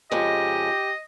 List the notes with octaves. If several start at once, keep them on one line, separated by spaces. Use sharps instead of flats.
F2 C#3 G#3 G4 D#5